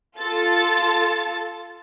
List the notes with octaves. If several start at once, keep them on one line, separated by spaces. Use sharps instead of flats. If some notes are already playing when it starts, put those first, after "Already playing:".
F4 A4 A6